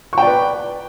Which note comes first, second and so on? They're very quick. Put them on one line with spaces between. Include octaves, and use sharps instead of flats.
C#6 G5 D5 B4